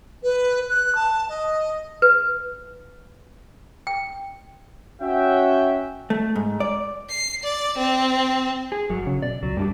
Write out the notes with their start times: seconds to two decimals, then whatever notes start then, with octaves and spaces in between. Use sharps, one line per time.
0.23 B4
0.69 F#6
0.95 A5
1.29 D#5
2.02 B4
3.87 G5
5.02 C#4 F#4 E5 G5
6.10 A3
6.36 G#2
6.60 D5
7.10 C7
7.43 D5
7.78 C4
8.72 G#4
8.90 G1 F#2 F#3
9.07 C#3
9.22 B2 D5
9.43 C#2 F#3
9.57 F#2 G3 D4 G4